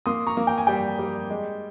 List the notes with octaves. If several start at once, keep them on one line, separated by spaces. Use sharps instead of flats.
A#3 C6 D#6
A#5 C#6
A#3
G5
G#5
G3 G5
G3
G#3